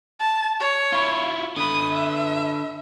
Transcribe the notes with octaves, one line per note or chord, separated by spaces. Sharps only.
A5
C#5
E4 F4
D3 B4 D#6
E5